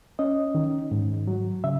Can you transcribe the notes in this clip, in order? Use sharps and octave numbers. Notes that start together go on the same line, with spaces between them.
C#4 D#5
D#3
G#2
F#3
C#3 E5